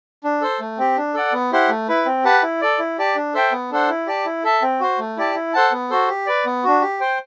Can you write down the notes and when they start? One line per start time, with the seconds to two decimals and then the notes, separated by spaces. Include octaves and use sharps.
0.24 D4
0.42 A4 C5
0.60 A3
0.78 C4 G4
0.97 D4
1.14 A4 D5 F#5
1.33 B3
1.52 E4 G4 C5 F#5
1.69 A3
1.88 E4 B4
2.06 C4
2.24 G4 B4 F#5 A5
2.43 E4
2.61 A4 D5
2.79 E4
2.98 G4 D5 A5
3.15 D4
3.34 A4 C5 E5 G5
3.52 B3
3.71 D4 A4 C5 F#5
3.89 E4
4.07 G4 D5 A5
4.25 E4
4.44 A4 E5 A5
4.62 C4
4.80 F#4 C5
4.99 A3
5.17 E4 G4 D5 A5
5.35 E4
5.54 A4 C5 F#5 A5
5.72 B3
5.90 F#4 A4 C5
6.09 G4
6.27 B4 D5
6.46 B3
6.64 D4 F#4
6.82 G4
7.00 C5 G5